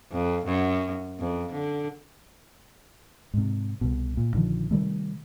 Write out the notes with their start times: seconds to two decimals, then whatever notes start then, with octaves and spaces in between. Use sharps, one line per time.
0.12 F2
0.46 F#2
1.20 F2
1.52 D3
3.34 G#2 C3
3.81 C2 B2
4.17 A#2
4.33 A#1 D3 D#3 F3
4.71 C3 D#3 G3 A3